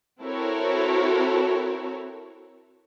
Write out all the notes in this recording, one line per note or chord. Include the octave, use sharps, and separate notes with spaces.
C4 E4 F#4 A4 A#4 C#5